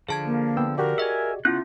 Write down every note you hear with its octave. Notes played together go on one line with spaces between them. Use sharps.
D3 F3 G#4 A5 G#6
A#3
B3 G5 E6
F#4 G4 A#4 D5
G#4 D#5 E5 G#5
C#3 B3 C#4 E4 F4 F#5 F#6